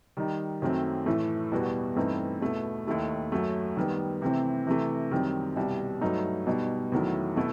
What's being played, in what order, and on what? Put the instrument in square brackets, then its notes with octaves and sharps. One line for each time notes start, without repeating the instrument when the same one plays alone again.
[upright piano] D#3 G3 D#4
F#2 D#3 F#3 A3 C4
A2 E3 A3
E2 B2 G3 B3 F#4
G2 E3 A3 C4 D#4
E2 B2 A3
D#2 D#3 A3 E4
F#2 F#3 A3
D#3 G3 B3
C3 E3 A3 C4
C3 E3 A3
F#2 D#3 G3 C4
C2 B2 G3
G2 F#3 A3 D#4
B2 G3 D#4
E2 D#3 F#3 A3 E4
B2 A3 E4